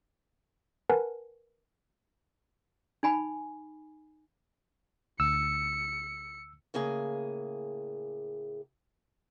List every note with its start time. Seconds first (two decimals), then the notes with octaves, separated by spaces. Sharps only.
0.90 A#4 B4 F#5 G#5 A5
3.03 D#4 G#5 B5
5.20 D2 E6 C#7
6.74 A2 C#3 A#3 G#4 G#5